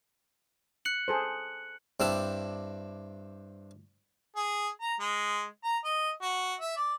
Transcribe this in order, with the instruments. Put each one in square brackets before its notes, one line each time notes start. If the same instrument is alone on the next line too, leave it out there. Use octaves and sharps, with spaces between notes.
[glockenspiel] F#6 C#7 F#7
[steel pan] G#4 A4 C5
[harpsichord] G2 C4 D4 E4 E5 A5
[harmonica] G#4
A#5
G#3
A#5
D#5
F#4
E5
D5